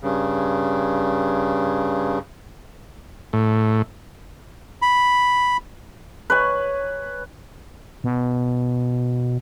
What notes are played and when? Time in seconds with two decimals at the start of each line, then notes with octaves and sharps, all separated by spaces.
0.01 G2 C#3
3.33 A2
4.82 B5
6.30 B4 C#5 G#5
8.04 B2